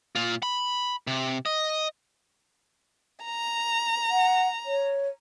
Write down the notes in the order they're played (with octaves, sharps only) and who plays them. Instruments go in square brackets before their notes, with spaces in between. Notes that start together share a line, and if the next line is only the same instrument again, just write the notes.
[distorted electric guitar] A#2 F4
B5
C3
D#5
[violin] A#5
[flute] F#5
C#5